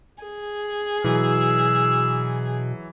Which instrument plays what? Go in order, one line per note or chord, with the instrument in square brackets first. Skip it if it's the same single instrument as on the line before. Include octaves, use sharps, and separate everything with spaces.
[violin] G#4
[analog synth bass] B2 [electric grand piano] E3 F#3 [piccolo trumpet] E6